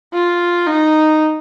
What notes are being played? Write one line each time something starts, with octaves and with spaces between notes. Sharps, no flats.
F4
D#4